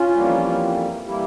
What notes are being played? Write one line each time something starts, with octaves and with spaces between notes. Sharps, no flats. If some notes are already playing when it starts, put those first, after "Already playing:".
Already playing: C#4 F4
F2 E3 G3 A#3
E3 G3 A#3 E4 G4